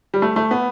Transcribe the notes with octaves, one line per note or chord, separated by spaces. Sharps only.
G3
A3
A3
B3